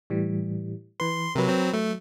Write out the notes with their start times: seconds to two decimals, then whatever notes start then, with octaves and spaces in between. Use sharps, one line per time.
0.10 A2 E3 G3
1.00 E3 B4 C6
1.35 C3 F#3 A#4 B4
1.48 F#3 C4
1.74 F#3 A3